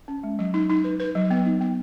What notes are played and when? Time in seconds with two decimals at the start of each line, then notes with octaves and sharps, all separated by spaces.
0.08 C#4
0.23 G#3
0.39 F#3
0.54 D#4
0.69 D#4
0.84 B4
1.00 B4
1.15 F#3
1.31 B3
1.46 D#4
1.61 B3